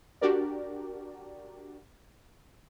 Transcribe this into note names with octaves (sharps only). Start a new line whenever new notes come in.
D4 F#4 G4 A#4 D5